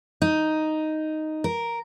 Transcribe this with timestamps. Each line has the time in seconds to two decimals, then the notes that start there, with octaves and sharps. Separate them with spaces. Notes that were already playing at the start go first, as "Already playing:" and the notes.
0.22 D#4
1.44 A#4